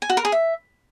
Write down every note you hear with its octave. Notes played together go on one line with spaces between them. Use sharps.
G#5
F#4
A#4
G#4
E5